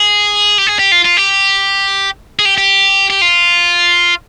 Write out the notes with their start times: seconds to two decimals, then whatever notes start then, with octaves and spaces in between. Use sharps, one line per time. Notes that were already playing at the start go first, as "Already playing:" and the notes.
Already playing: G#4
0.58 G4
0.67 G#4
0.79 G4
0.92 F4
1.05 F4
1.17 G4
2.39 G#4
2.45 G4
2.58 G4
3.10 G4
3.22 F4